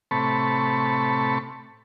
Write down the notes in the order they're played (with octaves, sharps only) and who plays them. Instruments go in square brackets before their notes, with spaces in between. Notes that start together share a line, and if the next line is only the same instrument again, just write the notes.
[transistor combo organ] A2 C3 A5 B5 C#6